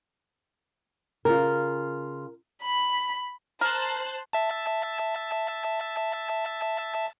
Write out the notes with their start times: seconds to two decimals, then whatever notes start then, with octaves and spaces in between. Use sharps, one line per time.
1.25 C#3 F4 A#4
2.63 B5
3.61 A#4 C5 A5 F#6
4.33 E5 A5